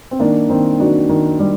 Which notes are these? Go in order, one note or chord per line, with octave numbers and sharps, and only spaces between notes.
C4
D#3 A#3 D4
D#3 C4 D#4
D#3 D4 F#4
D#3
G3